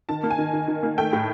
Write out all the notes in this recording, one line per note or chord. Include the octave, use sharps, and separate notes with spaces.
D#3 A5
A#3
G#5
D#3
D#3
D#3
A#3
A3 G5
A2